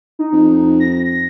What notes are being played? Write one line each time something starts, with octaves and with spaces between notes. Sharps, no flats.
D#4
F2
A#6